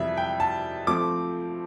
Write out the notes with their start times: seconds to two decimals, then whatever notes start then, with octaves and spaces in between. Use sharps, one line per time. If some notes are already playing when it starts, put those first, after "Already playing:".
Already playing: F2 C3 E3 G3 E5
0.17 G5
0.40 A5
0.87 F3 A3 C4 D6